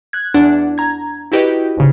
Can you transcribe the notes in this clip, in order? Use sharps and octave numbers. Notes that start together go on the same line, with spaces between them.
F#6 G#6
E2 D4 F#5
A#5 G#6
E4 F#4 G4 B4 D#5
G#1 C#3